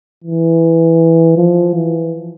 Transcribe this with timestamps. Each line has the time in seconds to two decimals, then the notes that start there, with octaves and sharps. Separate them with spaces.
0.24 E3
1.38 F3
1.75 E3